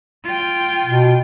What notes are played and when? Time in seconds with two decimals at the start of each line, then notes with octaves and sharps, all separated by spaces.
0.24 F4 G5
0.85 B2